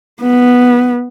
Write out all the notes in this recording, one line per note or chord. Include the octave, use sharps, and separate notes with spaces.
B3